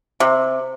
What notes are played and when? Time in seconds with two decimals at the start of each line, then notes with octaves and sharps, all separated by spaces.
0.20 C3